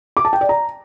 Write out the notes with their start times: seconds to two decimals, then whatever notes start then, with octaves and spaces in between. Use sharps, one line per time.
0.17 D6
0.25 A5
0.33 G5
0.41 D5
0.49 A#5